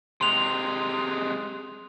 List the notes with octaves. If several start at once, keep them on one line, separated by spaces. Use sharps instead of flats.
C3 G#3 C6 F7